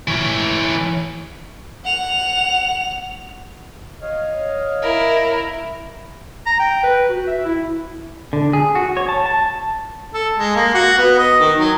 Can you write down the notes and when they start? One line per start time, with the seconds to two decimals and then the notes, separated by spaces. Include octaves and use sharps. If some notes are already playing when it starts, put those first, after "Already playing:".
0.08 E3 C#5
1.84 F#5 F7
4.02 C#5 D#5 F5
4.82 E4 A#4
6.46 A#5
6.59 G5
6.84 B4
7.09 F#4
7.27 E5
7.45 E4
8.33 D3
8.53 G#4
8.75 F#4
8.97 C#5
9.08 A5
9.26 A5
10.14 A4
10.38 G#3
10.56 A#3
10.74 F#4
10.98 B3
11.18 D#5
11.40 D#3
11.59 F#3